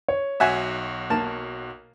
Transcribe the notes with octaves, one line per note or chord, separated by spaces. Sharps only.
C#5
B1 F#4 E5 F#5 G#5 E7
A#3 A5